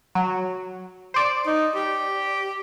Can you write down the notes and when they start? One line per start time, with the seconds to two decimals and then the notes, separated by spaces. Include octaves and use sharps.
0.15 F#3
1.14 C5 D5
1.47 D#4
1.75 G4